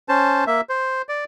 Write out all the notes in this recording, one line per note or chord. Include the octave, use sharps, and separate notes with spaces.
C#4 C5 A5
A#3 E5
C5
D5